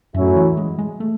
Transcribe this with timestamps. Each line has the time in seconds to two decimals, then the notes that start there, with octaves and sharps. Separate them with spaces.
0.14 F#2 A2 F#3 C#4 E4
0.36 E3
0.57 G#3
0.79 G#3
1.00 A3